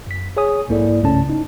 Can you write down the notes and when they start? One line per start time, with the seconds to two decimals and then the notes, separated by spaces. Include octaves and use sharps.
0.07 F#2 B6
0.37 G#4 C#5 G#5 D#6
0.68 B1 G#2 A#3 E4 A4 D5
1.02 C2 G2 C#3 A3 C#4 A5
1.30 D#4